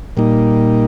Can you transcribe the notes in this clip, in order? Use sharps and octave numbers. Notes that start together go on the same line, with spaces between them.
A#2 G3 A#3 D#4